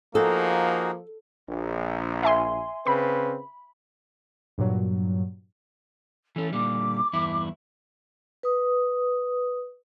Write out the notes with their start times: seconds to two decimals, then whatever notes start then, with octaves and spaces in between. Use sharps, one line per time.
0.15 F3 A#3 D#4 F#4 G#4 A4
1.49 A#1
2.23 E5 G#5 C6
2.87 C#3 C4 B4 B5
4.58 G2 A#2 F#3
6.36 E3 C#4 A4
6.53 A#2 D3 G3 D6
7.13 E2 G2 E4
8.43 B4 D#6